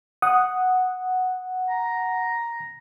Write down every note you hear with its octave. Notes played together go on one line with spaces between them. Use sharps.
F#5 D#6
A#5